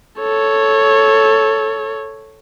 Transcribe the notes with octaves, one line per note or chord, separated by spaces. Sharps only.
A4 C#5